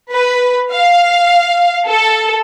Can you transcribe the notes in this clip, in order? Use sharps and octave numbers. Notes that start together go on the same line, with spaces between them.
B4
F5
A4